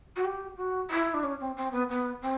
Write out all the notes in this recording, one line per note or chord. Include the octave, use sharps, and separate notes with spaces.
F#4
G4
F#4
E4
D4
C#4
C4
C4
B3
B3
C4